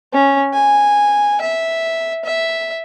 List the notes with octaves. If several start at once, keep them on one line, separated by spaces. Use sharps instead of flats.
C#4
G#5
E5
E5